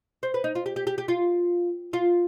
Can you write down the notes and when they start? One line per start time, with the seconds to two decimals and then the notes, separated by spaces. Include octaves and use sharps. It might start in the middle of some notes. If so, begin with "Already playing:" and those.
0.23 C5
0.34 B4
0.44 D#4
0.55 F4
0.66 G4
0.76 G4
0.87 G4
0.98 G4
1.08 F4
1.93 F4